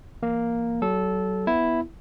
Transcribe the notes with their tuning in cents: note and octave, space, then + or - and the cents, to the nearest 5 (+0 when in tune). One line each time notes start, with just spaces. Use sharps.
E3 +35 A#3 +0
F#3 +35 A4 -15
B3 +0 E4 +0